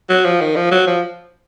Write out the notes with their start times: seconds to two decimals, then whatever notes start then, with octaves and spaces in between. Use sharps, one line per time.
0.09 F#3
0.25 F3
0.41 D#3
0.56 F3
0.72 F#3
0.87 F3